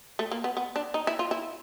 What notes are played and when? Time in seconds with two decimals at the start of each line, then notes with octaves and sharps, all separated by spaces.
0.19 A3
0.31 A#3
0.44 B3
0.57 B3
0.76 D4
0.94 D#4
1.07 E4
1.19 F4
1.31 E4